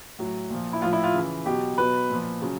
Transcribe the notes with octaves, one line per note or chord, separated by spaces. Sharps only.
A2 F#3
A#2 F3
E4
A2 F3 F4
E4
F4
C#3 E3
B2 F#3 G4
B2 F#3 B4
A#2 F3
C#3 F#3